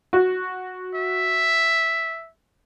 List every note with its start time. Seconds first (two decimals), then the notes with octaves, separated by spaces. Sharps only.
0.13 F#4
0.95 E5